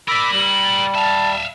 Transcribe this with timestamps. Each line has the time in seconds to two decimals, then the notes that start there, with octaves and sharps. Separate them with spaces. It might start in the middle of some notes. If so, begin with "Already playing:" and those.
0.08 A#4 D5 B5 D6 E6
0.32 G3 F#7
0.95 E5 F5 A5